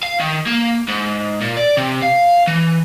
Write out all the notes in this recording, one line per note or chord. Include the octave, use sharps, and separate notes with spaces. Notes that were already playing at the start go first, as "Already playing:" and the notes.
F5
D#3
A#3
G#2
A#2
D5
C3
F5
E3